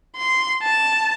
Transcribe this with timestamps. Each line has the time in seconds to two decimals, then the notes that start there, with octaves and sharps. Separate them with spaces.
0.16 C6
0.63 A5